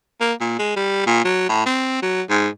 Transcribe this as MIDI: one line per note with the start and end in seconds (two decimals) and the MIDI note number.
0.21 0.34 58
0.40 0.57 46
0.59 0.74 56
0.76 1.04 55
1.07 1.22 46
1.25 1.48 54
1.49 1.65 45
1.66 1.98 60
2.02 2.22 54
2.30 2.49 44